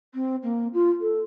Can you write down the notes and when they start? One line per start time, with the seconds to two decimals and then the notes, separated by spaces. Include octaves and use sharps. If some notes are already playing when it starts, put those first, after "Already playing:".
0.14 C4
0.43 A#3
0.73 F4
1.01 A4